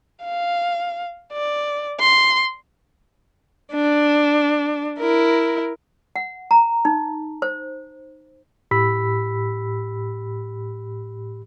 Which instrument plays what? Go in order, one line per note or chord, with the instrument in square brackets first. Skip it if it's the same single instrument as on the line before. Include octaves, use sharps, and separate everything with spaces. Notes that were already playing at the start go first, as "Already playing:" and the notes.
[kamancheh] F5
D5
C6
[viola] D4
E4 A#4
[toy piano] F#5
A#5
D#4
C5
[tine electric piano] A2 G4 B5 E6 B6